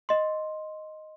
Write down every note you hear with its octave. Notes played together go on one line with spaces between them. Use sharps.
D#5 C6